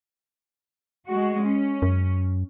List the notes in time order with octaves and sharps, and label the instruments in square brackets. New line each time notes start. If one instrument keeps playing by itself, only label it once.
[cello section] G#3 F#4
C#4
[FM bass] F#2